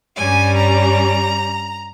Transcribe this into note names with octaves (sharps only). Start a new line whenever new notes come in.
G2 G3 C#4 G#5
A#5